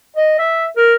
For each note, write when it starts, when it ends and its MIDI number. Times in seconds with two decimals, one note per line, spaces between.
0.16 0.38 75
0.39 0.65 76
0.77 0.94 70